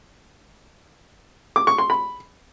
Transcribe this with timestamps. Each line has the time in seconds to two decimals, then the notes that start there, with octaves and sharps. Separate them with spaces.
1.56 D6
1.67 C#6
1.78 C6
1.90 B5